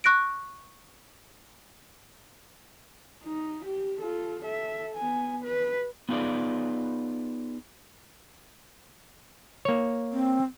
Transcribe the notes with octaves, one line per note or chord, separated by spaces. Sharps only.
C#6 F#6 A#6 D7
D#4
G4
F4 A4
A4 E5
B3 G#5
B4
B3 D#4 F4 G#4 B4 D5
A#3 C#5
C4